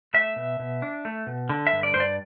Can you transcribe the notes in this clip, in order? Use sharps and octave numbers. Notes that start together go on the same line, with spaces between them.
A3 E5
B2
B2
D4
A3
B2
D3
E5
G2
D5
G2 C5
D5